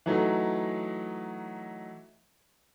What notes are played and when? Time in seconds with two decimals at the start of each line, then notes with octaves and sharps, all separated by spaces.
0.06 E3 F#3 A3 D#4